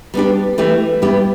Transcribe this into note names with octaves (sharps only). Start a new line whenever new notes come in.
G3 B3 D4 G4
E3 A3 E4 G4
G3 B3 E4 G4